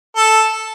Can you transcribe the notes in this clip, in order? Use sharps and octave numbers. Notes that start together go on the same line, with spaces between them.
A4